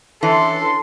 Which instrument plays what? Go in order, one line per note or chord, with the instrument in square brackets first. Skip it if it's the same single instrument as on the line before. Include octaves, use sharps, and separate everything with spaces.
[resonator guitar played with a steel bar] E3 [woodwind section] C#4 D4 C6 [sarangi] A4